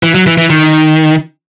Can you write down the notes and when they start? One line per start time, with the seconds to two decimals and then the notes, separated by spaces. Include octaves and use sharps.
0.03 E3
0.15 F#3
0.27 E3
0.38 E3
0.50 D#3